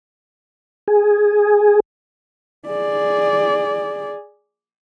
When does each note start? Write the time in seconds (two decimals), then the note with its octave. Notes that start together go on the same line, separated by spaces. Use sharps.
0.88 G#4
2.67 G#4 D5